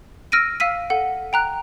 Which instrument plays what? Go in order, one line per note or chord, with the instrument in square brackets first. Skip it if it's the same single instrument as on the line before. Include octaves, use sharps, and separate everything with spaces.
[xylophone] E6 F6 A#6 D7 D#7
F5 E6 B6 D#7
A4 F#5
G5 A#5 F#6